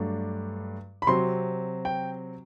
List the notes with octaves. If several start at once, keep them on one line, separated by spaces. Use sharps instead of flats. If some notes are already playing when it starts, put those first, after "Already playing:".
Already playing: G2 F#3 A3 D4
B5
C3 F#3 C4 C6
G5